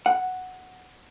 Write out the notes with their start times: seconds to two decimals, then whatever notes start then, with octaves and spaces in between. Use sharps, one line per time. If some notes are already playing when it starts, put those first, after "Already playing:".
0.06 F#5